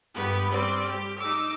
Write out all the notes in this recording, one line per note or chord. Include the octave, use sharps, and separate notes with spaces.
G2 B3 G4 B4
G3 C4 D5
G4
D#4 D6 E6